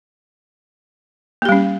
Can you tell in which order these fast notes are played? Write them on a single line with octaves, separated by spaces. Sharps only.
A#3 G4 G3 C#4